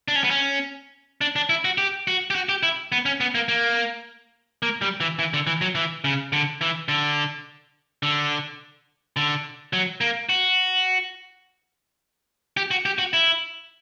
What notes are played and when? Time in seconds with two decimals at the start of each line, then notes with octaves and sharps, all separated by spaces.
0.08 D4
0.16 C#4
0.24 B3
0.31 C#4
1.21 D4
1.36 D4
1.50 E4
1.65 F#4
1.78 G4
2.07 F#4
2.30 G4
2.35 F#4
2.49 G4
2.63 E4
2.92 B3
3.06 C#4
3.21 B3
3.35 A#3
3.48 A#3
4.63 A#3
4.82 G3
5.01 E3
5.19 E3
5.34 D3
5.47 E3
5.61 F#3
5.75 E3
6.04 C#3
6.33 D3
6.61 E3
6.89 D3
8.03 D3
9.17 D3
9.73 F#3
10.01 A#3
10.29 F#4
12.57 G4
12.71 F#4
12.86 G4
12.99 F#4
13.13 E4